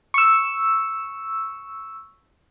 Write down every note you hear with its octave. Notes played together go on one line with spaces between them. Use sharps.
C#6 E6